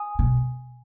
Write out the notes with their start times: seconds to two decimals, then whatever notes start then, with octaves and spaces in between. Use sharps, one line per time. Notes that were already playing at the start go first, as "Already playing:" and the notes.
Already playing: G#5 D#6
0.19 B2